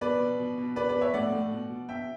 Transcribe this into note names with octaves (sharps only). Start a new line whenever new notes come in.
B2 B4 D5
B2
B2
B2
B2 B4 D5
B4 D5
B2
C#5 E5
A2 D5 F#5
A2
B2
B2
B2 E5 G5